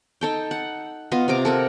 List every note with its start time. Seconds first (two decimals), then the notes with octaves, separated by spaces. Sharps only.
0.21 D#4 A4 G5
0.51 F#5
1.12 B3 F4 D#5
1.28 C3 F4 A#5 D6
1.45 A4 A#4 F#5